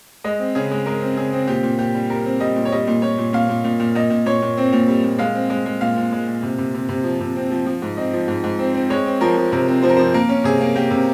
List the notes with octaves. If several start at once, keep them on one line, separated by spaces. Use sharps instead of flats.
G#3 D#5
C4
C#3 G#4
G#3
G#3 A#4
C4
C#3 G#4
C4
A#2 G4
A#2
A#2 G4
G3
G3 A#4
C4
G3 D#5
A#2
C#5
G3 D#5
A#2
A#2 C#5
A#2
A#2 F5
A#2
A#2
A#2
A#2 D#5
A#2
A#2 C#5
A#2
C4
A#2
G3
A#2
G#3 F5
C4
G#3
G#3
A#2 F5
A#2
G#3
A#2
C3
C3
C3
C3
F3
C3
C4
F3
F3
G#2
C4 D#5
F3
G#2
G#2
C4
C4
G#3 C#5
C4
F3 A#4
F3
C3 A#4
C4
F3 C5
A#4
F3 C5
A#3 A#4
C#4
C3 G#4
A#3
A#3 G4
C3